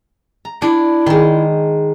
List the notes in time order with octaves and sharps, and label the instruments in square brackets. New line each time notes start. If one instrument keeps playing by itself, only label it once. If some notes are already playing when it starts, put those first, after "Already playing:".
[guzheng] A#5
[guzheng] D4 [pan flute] E4
[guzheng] D#3 G#3